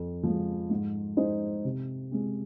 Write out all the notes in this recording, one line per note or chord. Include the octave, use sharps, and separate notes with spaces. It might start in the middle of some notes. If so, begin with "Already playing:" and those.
Already playing: F2
F3 G#3
G#2
G#3 D#4 C5 D#5
C3
G#3 C4